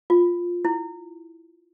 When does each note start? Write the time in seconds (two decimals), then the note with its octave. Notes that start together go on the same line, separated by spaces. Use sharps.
0.10 F4
0.65 E4